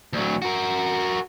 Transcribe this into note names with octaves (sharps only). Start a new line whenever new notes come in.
D2 F#3
F#4 A#4